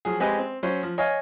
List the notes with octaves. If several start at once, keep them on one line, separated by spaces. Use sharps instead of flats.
F3 F#3 G#4
G#3 C4 G4 B4 D#5 G#5
C4
F#3 C#4 C5
F3
C#5 D#5 F5 G#5